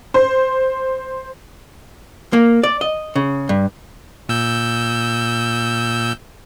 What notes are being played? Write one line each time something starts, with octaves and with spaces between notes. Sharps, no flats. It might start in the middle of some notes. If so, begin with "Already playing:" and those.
C5
A#3
D5
D#5
C#3
G2
A#2 E6 G6